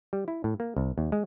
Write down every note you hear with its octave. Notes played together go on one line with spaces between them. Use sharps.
G3
E4
A2
A#3
C2
D#2
G#3